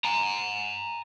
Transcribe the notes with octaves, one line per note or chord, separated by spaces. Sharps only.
G#5 A#5